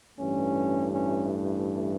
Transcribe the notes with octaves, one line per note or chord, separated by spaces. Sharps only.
A1 G2 E3 A3 C#4
C#4